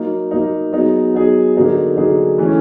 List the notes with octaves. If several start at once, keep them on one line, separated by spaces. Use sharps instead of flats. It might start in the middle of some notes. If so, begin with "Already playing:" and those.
Already playing: F#3 A#3 D#4
F#3 A#3 D#4
F#3 B3 D#4 G#4
F#3 B3 D#4 G#4
D3 F#3 A#3 D#4 G#4
D3 F#3 A#3 D#4 G#4
E3 A3 C#4